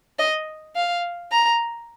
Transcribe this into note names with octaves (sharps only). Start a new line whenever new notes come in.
D#5
F5
A#5